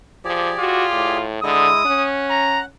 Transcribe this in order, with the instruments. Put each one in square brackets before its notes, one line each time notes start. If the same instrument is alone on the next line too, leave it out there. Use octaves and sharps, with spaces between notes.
[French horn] F3 [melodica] G4 G#4 D5
[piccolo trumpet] F4 [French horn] F#4
[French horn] A2
[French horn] D3 [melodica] G#3 E4 D#5 [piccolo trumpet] D#6
[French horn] C#4 [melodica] F#5
[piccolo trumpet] A#5